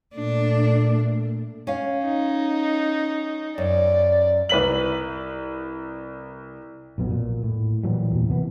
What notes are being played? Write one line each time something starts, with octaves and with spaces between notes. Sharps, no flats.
A#2 A3 D4
C#4 F5
D#4
F#2 D5
C2 B4 B6 F#7
B1 F2 B2 F#3
A#2
A2
A#2 E3 F#3 G3
E2 A#2
C3 E3 A#3 B3